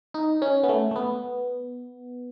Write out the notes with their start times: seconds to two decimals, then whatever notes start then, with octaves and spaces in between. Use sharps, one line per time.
0.14 D#4
0.42 C#4
0.63 B3
0.69 A3
0.91 A3
0.96 B3